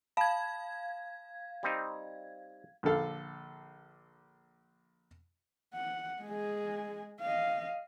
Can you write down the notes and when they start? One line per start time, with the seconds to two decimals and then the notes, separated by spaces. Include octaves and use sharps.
0.17 F5 A5 B5 G#6
1.63 G3 C4 D#4
2.83 A#1 D3 A4 F5
5.74 F#5
6.22 G#3 G#4
7.21 D#5 F5